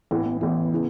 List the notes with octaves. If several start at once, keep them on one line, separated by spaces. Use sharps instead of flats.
A1 A2 E3 B3
B3
A1 A2 E3 B3
C#3 E3